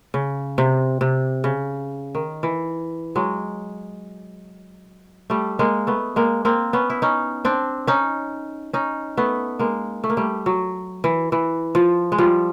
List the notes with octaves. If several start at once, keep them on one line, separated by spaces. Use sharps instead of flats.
C#3
C3
C3
C#3
D#3
E3
F#3 G#3
G3 A3
G#3 A#3
A3 B3
G#3 A#3
A#3 C4
B3 C#4
E4
C#4 D#4
C4 D4
C#4 D#4
C#4 D#4
A3 B3
G#3 A#3
A3
A#3
G3 A3
F#3
E3
E3
F3
G#3
F3 G3